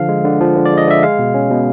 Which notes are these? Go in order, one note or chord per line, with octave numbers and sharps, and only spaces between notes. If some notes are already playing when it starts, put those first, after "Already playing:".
Already playing: D3 F3 F5
G#3
D3
F3
D3
D5
G#3
D#5
D3 E5
G#3 F5
B2
C#4
B2